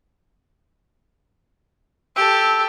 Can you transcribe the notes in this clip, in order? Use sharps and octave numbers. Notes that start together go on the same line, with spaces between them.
G4 A4 E6